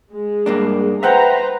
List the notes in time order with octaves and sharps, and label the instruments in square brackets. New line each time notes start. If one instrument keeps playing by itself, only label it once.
[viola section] G#3
[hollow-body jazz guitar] G2 A#3 D4
[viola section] B4 C5 A#5 [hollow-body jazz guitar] E5 F#5 G5